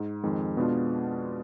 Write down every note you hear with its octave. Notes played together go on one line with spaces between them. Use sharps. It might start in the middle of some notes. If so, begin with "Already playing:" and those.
Already playing: G#2
F2 D#3 G#3
B2 G#3 B3 D4 F4